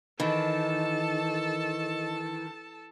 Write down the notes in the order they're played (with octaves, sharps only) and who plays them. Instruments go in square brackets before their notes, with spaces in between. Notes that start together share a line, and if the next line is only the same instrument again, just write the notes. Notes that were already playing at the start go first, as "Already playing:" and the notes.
[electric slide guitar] D#3 [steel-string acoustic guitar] E3 [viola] A4 A5 [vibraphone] D#5